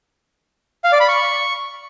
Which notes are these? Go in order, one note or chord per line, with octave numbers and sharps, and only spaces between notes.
F5
D5
B5
C#6